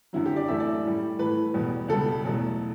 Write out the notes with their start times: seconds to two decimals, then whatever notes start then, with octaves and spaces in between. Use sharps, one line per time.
0.13 F#2 D3 F#3 E4
0.26 G4
0.36 D5
0.48 F#2 E3 A3 E5
0.60 D5
0.84 A2 G3
1.19 A2 E3 A3 B4
1.54 E2 B2 G3
1.88 C#2 B2 G3 A4
2.24 E2 B2 F#3 A3